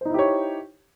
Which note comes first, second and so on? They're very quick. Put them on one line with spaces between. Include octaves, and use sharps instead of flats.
C5 D#4 E4 G4 C#5